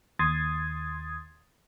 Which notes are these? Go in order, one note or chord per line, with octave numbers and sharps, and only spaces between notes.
D#2 C6 D#6 G#6 A6